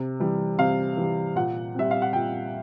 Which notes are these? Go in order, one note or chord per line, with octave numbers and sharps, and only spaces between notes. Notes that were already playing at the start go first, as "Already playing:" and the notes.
Already playing: C3
E3 G3
C3 F5
E3 G3
A#2 F#5
G3 C4 E5
F5
F#5
A#2 G5